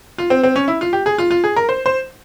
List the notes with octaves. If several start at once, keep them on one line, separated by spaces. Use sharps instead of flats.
F4
C4
C4
C#4
E4
F4
G4
G#4
F4
F4
G#4
A#4
C5
C5